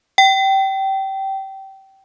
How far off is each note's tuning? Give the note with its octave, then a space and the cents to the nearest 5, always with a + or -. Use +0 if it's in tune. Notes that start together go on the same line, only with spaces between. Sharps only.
G5 -20